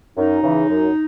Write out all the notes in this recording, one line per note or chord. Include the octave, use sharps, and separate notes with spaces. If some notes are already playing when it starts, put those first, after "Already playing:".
F#2 D#4
C#3 E3
F#2